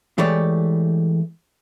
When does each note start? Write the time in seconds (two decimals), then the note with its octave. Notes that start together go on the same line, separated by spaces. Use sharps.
0.18 E3 G#3 A3 G4 C#5 D5